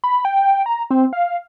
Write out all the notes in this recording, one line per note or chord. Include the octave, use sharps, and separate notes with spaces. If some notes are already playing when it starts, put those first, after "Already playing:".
B5
G5
A#5
C4
F5